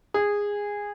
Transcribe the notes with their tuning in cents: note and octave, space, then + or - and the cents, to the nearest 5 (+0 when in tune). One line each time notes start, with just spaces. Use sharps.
G#4 -15